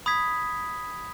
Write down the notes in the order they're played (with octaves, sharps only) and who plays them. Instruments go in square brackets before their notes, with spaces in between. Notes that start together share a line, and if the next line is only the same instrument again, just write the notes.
[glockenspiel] B5 D#6 G#6 B6